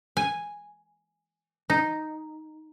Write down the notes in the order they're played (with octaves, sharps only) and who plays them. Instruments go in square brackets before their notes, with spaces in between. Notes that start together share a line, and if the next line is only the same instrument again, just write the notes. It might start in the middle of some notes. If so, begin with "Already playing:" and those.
[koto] G#5
D#4